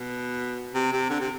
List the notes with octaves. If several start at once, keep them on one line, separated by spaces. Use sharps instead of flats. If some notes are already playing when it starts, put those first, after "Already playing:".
Already playing: B2
C3
C3
D3
C3